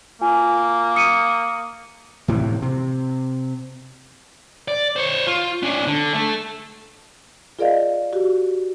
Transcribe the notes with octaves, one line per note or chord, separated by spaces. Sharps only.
A#3 F4 G#5
D#6 C#7 D#7
A2 C3 E3
C3
D5
C5 C#5
F4
C#4 D4
D3
A3
F4 G#4 A#4 D5 D#5 F5
F#4 G4